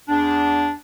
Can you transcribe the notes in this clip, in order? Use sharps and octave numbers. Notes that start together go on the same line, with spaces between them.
E2 D4